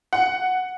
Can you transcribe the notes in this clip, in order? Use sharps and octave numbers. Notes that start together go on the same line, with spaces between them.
F#5